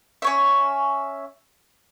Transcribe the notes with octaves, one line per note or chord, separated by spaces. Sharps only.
C#4 C#5 E5